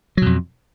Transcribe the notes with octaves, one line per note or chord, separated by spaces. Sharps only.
F2 B2 F#3